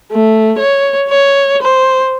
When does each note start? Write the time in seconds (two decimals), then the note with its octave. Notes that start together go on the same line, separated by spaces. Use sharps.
0.11 A3
0.58 C#5
1.09 C#5
1.62 C5